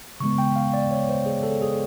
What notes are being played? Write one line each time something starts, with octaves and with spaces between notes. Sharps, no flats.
C#3 E3 G#3 B3 C#6
G5
F5
D5
C#5
C5
G#4
A4
G#4